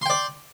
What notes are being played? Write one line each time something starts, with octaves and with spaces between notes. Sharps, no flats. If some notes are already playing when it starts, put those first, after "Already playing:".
D5 G5 C6